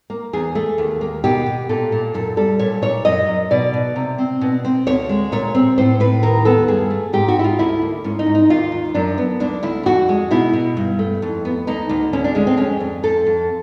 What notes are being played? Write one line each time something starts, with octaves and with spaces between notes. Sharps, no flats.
A#3
E2 G#4
A3
D#2
A#3
B2 G4
B2
A#2 A4
A#2
F#2 A4
G3 A4
A#2 C#5
A#2 C#5
F#2 D#5
F#2
B2 D5
B2
C3
C4
B2
C4
D2 C#5
G#3
A#2 C#5
C4
A2 C5
A2 B4
D#2 A#4
B3 A4
G2 G#4
A3
G#2 G4
F#4
G#2 E4
F4
D2 E4
A#3
G#2 C#4
D#4
G#2
D#4
D#2 F4
D#2
F#2 D4
B3
D2 D4
D2 E4
F2 F#4
G#3
B2 E4
B2
G2
A3
F2
B3
D2 D#4
D2
D2 C#4
D4
G#3 C#4
C4
F2 C#4
F2
F2 A4
F2